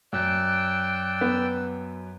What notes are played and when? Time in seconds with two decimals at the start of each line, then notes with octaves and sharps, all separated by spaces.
0.13 F#2 D5 G5 E6 F#6
1.21 B3